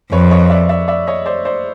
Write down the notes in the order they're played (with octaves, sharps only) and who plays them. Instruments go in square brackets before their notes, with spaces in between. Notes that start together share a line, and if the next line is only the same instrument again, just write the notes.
[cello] F2 [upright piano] B4 C#5
[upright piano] C#5 D#5
D5 E5
D5 E5
D5 E5
C#5 D#5
C5 D5
C5 D5